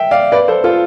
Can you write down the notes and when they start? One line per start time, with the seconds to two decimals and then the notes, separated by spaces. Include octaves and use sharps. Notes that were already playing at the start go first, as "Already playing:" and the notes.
Already playing: E5 G5
0.11 D5 F5
0.32 B4 D5
0.48 A4 C5
0.64 F4 A4